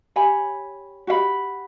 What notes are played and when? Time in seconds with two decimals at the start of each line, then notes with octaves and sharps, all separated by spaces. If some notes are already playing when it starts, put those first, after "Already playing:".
0.16 G4 C#5 G#5 B5
1.07 F#4 G4 F5 B5